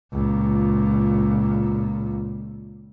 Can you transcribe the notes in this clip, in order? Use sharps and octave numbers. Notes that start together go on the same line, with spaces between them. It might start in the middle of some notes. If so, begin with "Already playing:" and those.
C#2 A#2